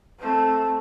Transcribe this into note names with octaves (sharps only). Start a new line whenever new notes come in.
A3 C4